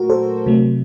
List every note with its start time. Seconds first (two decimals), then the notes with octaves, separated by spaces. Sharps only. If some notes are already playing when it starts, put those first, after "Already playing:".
Already playing: A#2 F#3 A3 F#4 A#4
0.10 A4 C5
0.46 C3 F#3 A3